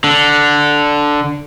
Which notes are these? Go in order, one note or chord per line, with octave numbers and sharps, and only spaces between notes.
D3